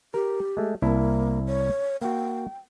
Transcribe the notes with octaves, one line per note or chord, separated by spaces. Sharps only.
G4 A#4
G#3 A3
C2 A#3 E4 A5
C#5
A#3 F#4 G5